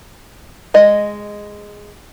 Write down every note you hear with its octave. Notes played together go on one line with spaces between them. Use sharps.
G#3 D#5